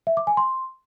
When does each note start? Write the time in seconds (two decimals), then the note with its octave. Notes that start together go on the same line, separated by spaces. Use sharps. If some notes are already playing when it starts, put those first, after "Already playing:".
0.07 E5
0.17 D6
0.27 G#5
0.37 C6